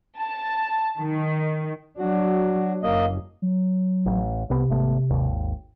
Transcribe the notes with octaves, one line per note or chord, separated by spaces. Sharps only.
A5
D#3
F#3 D4 F#4
F#1 A#3 D#5
F#3
A1
C2 C3 B3
G#1 A3 B3
G#1 D#2